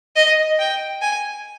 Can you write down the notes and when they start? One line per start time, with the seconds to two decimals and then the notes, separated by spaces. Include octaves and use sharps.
0.16 D#5
0.59 G5
1.01 G#5